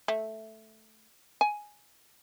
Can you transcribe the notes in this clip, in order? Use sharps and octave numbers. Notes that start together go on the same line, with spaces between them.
A3
G#5